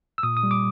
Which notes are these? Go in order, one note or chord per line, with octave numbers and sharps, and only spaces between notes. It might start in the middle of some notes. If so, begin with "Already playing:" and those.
E6
A#2 D#6
D#6
G3
D6